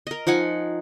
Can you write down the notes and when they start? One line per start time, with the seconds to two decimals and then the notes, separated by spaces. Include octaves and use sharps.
0.07 A#4 D#5
0.27 F3 D#4 F#5 G#5